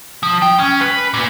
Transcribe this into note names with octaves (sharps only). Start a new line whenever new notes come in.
F3
G5
C#4
B4
A#2